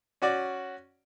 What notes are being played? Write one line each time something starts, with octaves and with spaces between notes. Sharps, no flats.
C#4 F#4 D5